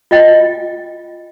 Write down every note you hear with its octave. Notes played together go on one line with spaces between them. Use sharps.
F4 D#5 G5